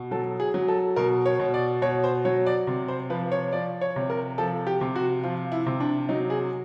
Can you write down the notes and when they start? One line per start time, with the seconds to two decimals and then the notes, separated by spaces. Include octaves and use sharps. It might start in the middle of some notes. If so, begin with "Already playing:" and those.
Already playing: B2
0.11 F#3 A4
0.40 G#4
0.54 F#3
0.68 A4
0.96 B2 A#4
1.26 C#5
1.40 B2
1.54 D5
1.82 B2 C#5
2.04 C5
2.25 F#3 C#5
2.46 D5
2.67 C3
2.88 C5
3.10 F3 B4
3.32 C#5
3.53 F3 D5
3.81 C#5
3.96 C3
4.10 A#4
4.38 F3 A4
4.67 G4
4.81 C3
4.96 F#4
5.23 F3 F4
5.52 E4
5.66 C3
5.80 D4
6.09 F#3 D#4
6.30 G#4